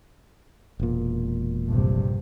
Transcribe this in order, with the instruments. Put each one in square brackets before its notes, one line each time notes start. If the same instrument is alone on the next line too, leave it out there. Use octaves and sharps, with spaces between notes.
[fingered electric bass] E1 A#2
[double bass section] A#1 G2 C3